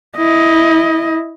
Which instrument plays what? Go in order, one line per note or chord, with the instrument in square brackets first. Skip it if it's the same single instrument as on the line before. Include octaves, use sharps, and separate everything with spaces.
[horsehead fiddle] E4 D#5